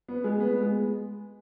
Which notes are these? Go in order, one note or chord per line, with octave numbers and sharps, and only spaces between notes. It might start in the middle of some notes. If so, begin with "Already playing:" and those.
B3
G#3
B3
G#3